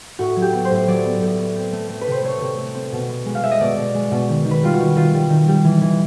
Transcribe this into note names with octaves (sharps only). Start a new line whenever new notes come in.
A2 F#4
F#3
G4
B3
C5
A2
F#3 D5
B3
A2
B3
C4
A3
A3
B4
C3 C5
A3 C#5
C3
A3
C4
B2
B3
G#3
F5
G#3 E5
D#5
B2 D5
B2
G#3
B2
D#3
D#3
B4
G3 F4
F#4
D#3
D#3 F4
G3
D#3
G3
E3
E3